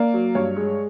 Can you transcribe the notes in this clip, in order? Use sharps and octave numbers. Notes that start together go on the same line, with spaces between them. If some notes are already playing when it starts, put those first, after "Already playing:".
Already playing: A#3 D5
F#3
G2 C#5
G#3